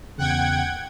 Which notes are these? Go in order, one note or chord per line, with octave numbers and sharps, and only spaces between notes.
E2 C#3 F#5 G5 G#6